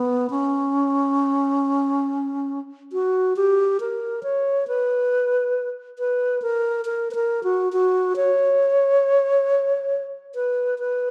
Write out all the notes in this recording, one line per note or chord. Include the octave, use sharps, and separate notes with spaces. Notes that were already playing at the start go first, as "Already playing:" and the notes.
Already playing: B3
C#4
F#4
G4
A#4
C#5
B4
B4
A#4
A#4
B4
A#4
F#4
F#4
C#5
B4
B4